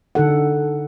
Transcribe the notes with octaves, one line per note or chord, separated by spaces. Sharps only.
D3 D#4 A4 F#5